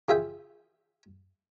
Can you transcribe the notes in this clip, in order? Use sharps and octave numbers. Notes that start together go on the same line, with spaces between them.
C#3 F4 G#4 E5 G5